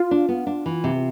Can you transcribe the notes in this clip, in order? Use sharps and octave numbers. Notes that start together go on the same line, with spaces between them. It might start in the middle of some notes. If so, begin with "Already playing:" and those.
Already playing: F4
D4
B3
D4
E3
C3